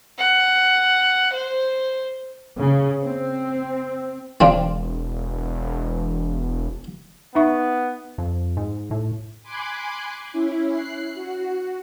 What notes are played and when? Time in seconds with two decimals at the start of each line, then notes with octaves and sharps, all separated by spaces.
0.18 F#5
1.33 C5
2.58 C#3
3.02 C4
4.41 E1 C4 D4 F4
7.35 B3 D#4 E5 C#6
8.18 F2
8.57 G#2
8.91 A2
9.43 G#5 B5 C6 D6 F#6 G#6
10.32 C#4 E4
10.70 F#6 C7
11.14 F#4